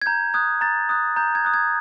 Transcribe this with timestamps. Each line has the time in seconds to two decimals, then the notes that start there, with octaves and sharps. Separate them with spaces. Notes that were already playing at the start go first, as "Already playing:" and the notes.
0.02 G#6
0.06 A#5 G6
0.34 D#6 F#6 G#6
0.61 A#5 A6
0.89 D#6 F#6
1.16 A#5 G6
1.35 G#6
1.45 D#6 F#6
1.54 G#6